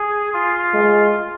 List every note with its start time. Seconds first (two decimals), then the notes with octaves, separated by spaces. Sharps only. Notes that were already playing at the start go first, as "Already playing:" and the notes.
Already playing: G#4
0.33 F4
0.73 G#3